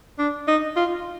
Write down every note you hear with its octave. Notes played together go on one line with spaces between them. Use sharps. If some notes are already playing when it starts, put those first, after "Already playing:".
D4
D#4
F4